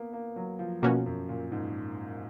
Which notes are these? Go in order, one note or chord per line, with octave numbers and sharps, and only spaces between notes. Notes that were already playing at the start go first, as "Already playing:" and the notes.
Already playing: A#3 B3
A#3
F#3
F3
B2 F3 A#3 C#4 F#4
F#2
A#2
G#2